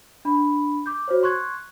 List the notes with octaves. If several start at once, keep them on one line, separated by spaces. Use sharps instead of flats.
D4 B5
D6 G6
F#4 C5 C#5
C6 C#6 F#6 G#6